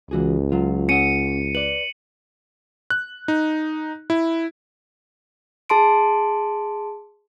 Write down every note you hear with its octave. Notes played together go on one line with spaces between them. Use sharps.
C#2 E3 F#4 G#4
F#3 F4
C#4 F#5 C#7 D#7
B4 D5 F#7
F#6
D#4
E4
G#4 A5 C6 D7